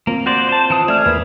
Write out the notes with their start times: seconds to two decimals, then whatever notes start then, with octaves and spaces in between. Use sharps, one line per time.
0.07 A#3 C4 F4
0.26 F#4 C5 D5
0.49 C5 A5
0.70 E3 A5 D#6
0.88 A3 G#4 D5 E5 F6
1.06 E2 A#3 B4